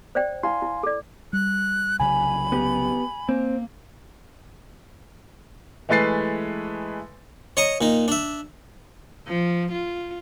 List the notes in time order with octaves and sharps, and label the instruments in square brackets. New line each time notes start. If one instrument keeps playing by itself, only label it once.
[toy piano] C5 D5 G5
[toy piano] E4 [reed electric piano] F5 G#5 C6
[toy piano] E4
A4 D5
[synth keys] G3 [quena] F#6
[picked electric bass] C2 C#3 F#3 [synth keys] G#5 [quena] B5
[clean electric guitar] B3 G4
[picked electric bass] A#3 [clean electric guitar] C4
[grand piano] E3 G#3 A3 B4 A6 C7
[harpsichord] C#5 D#5 A#5 C#6 D#6
A#2 D#4
D4 E5
[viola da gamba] F3
F4